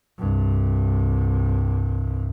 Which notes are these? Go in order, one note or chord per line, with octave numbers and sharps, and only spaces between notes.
C2 G2